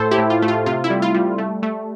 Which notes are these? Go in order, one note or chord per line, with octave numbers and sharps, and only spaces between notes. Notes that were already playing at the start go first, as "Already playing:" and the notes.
Already playing: A2 A4 C5
E4 G4
A2
F4
A3
F4
C3 F4
E4
G3
F4
G3
A3
A3